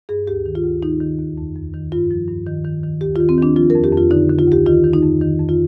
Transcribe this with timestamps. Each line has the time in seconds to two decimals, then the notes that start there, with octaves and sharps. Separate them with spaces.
0.09 G2 G#4
0.27 D2 G4
0.46 D#3
0.55 F4
0.64 D2
0.82 D#3 D#4
1.00 D#3
1.19 D#2
1.38 F2
1.55 F2
1.74 D#3
1.92 G2 F4
2.11 F3
2.28 G2
2.46 D#3
2.64 D#3
2.83 D#3
3.01 D#2 G4
3.16 F4
3.20 D#3
3.29 C4
3.38 D#3 D4
3.56 F3 F4
3.70 A#4
3.75 F2
3.84 G4
3.93 F2 F4
4.11 D3 D#4
4.30 D3
4.39 F4
4.47 D2 G4
4.66 D#3 F4
4.84 D#3
4.93 D#4
5.03 F2
5.21 D#3
5.40 F2
5.49 F4